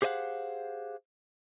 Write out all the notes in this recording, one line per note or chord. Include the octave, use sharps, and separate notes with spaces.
G4 G#4 C5 D#5 F5 F#5